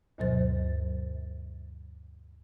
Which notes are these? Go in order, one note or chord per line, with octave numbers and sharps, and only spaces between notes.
D2 G2 B2 F#3 C5 A6